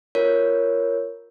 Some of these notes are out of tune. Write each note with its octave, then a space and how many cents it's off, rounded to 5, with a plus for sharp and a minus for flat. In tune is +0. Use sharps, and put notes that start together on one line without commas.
F4 +0 A#4 +0 C#5 +0